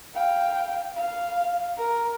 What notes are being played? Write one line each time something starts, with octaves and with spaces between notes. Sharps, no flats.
F5 G5
F5
A#4